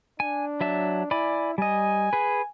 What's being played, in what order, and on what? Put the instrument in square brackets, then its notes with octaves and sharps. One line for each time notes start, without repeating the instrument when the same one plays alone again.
[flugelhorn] D4 [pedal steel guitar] G#5
[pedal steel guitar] F#3 E5 A5
[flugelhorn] E4 [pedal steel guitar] D5 G#5 B5
[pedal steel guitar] G3 D#5 [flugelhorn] G#5
[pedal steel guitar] G#4 B4